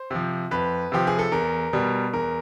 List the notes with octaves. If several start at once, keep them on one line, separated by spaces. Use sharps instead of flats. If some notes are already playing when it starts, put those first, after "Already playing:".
Already playing: C5
C3 F3
F2 B4
C3 F3 G4
G#4
A4
E2 A#4
B2 G3
E2 A#4